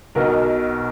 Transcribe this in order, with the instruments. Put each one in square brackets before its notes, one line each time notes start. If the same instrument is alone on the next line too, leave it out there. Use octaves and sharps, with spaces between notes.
[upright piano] B1 B2 A#4